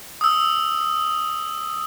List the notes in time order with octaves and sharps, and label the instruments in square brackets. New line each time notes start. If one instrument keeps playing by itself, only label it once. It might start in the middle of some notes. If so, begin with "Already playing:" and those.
[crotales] D#6 E6